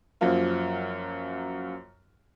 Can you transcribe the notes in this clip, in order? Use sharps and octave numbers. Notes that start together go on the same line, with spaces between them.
F#2 F3 F#3 A#3 F4